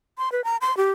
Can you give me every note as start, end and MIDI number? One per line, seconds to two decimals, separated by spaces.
0.18 0.32 84
0.32 0.44 71
0.44 0.57 82
0.61 0.76 84
0.77 0.91 67